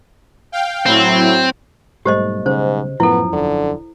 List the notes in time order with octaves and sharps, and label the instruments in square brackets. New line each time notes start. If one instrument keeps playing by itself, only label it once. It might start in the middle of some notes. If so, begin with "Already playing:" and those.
[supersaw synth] F5 G5
[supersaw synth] A2 F#3 E4 [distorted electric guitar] C4
[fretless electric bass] B1 G3 A3 [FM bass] G#2 [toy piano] G4 C5 D#5
[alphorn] G#2 [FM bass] C#3 [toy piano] C5
[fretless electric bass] F#2 F3 [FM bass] A2 [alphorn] B3 [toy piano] E4 A4
[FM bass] E1 [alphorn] D3